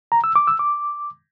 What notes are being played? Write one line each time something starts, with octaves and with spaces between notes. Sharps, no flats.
A#5
E6
D6
E6
D6